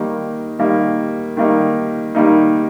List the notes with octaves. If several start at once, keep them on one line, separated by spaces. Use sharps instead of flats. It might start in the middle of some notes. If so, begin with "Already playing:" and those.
Already playing: D#3 G3 A#3 D#4
D#3 G3 A#3 D#4
D#3 G3 A#3 D#4
D#3 G3 A#3 D#4